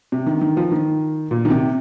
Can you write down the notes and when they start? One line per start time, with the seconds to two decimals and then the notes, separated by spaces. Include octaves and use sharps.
0.12 C3
0.26 D#3
0.41 D#3
0.57 F3
0.72 D#3
1.31 A#2
1.45 D#3
1.50 C3